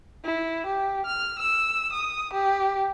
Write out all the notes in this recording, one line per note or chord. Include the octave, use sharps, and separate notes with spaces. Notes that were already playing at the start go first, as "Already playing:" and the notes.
E4
G4
F6
E6
D#6
G4